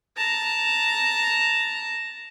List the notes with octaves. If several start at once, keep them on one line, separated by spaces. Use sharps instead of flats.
A5 A#5